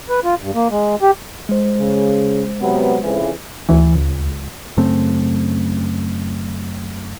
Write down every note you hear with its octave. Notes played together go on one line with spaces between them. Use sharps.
B4
F4
G2
A#3
G#3
G4
G#3 C5
C#3
C3 F#3 B3
F2 C#3 E3
D2 E3
C#2
F#2 C#3 A3 C4